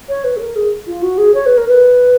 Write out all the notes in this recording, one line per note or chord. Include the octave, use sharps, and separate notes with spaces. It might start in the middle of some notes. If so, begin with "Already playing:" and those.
C#5
B4
G#4
A#4
G#4
F4
F#4
G#4
C#5
B4
A#4
B4